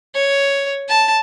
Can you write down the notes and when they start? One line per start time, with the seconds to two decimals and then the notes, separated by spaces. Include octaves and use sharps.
0.15 C#5
0.89 A5